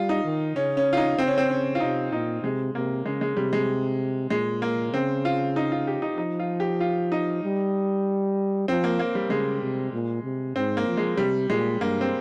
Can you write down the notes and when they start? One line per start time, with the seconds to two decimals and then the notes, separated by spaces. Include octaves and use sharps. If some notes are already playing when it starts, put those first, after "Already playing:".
Already playing: G3 F4
0.09 D#4
0.24 D#3
0.56 C#3 C#4
0.77 C#4
0.93 F4
0.97 D#4
1.18 C#3 C4
1.27 C#4
1.38 C4
1.50 C#4
1.75 F4
1.80 C3 D#4
2.12 A#2 D#4
2.43 C3 G#3
2.75 C3 A#3
3.05 C#3 G#3
3.21 G#3
3.37 C3 G3
3.53 G#3
4.30 A#2 G#3
4.62 A#3
4.93 C#3 C4
5.25 F4
5.56 D#4
5.72 F4
5.87 G4
6.02 D#4
6.18 F3 D#4
6.39 F4
6.60 G4
6.80 F4
7.12 D#4
7.43 G3
8.68 F3 C4
8.84 A#3
8.99 A#3
9.15 G3
9.30 C#3 G#3
9.62 C3
9.93 A#2
10.24 C3
10.56 G#2 C4
10.77 A#3
10.87 F3
10.97 G#3
11.17 C3 G3
11.50 A#2 G#3
11.80 G2 A#3
12.01 C4